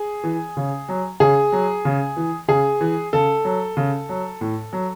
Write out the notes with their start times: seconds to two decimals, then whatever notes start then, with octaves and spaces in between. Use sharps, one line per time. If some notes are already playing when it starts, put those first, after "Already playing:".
Already playing: G#4
0.24 E3
0.57 C#3
0.89 F#3
1.20 C#3 G#4
1.52 F#3
1.85 C#3
2.17 E3
2.48 C#3 G#4
2.81 E3
3.13 C#3 A4
3.45 F#3
3.77 C#3
4.09 F#3
4.41 A2
4.73 F#3